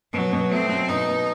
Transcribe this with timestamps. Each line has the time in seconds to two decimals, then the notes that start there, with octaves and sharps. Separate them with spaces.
0.13 B2 F#3
0.33 B2
0.51 A3 C4
0.69 F#3
0.89 B2 D#4
1.08 B2